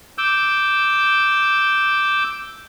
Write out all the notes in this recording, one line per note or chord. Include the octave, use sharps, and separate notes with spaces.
D6 E6 G6